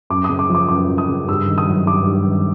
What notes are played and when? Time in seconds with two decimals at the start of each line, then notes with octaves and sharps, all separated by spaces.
0.10 F#2 D6
0.24 D#6
0.29 C#3
0.39 D6
0.50 F3
0.55 D6
0.68 F#2 D6
0.88 F#2
0.98 D#6
1.08 C#3
1.28 G2 E6
1.48 D#3
1.58 D#6
1.68 F#3
1.87 G2 D6
2.07 G2
2.27 D#3